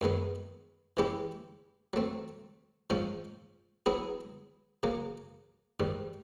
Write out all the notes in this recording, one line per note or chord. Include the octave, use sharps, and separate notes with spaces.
F#2 D#3 G#3 B3
E3 G#3 C#4 E4 G4
F#3 A3 C4
G#2 F3 G#3 C#4
F#3 B3 E4 G#4
C#3 F#3 A#3
G#2 D#3 G3